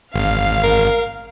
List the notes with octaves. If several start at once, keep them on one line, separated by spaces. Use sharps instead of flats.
G#1 F5
A#4